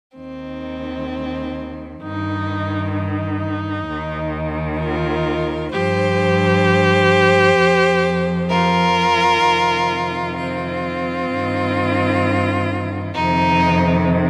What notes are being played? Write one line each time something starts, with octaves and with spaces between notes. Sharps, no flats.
D#2 D#3 C4
G2 D#3 D#4
D#4
D#2 D#3
F4 A#4
G2 F3 G4 C5
F2 F3
F4 A#4
F2 C3 D#3
C4 F4
G2 D#3
F2 C3 D#3 D#4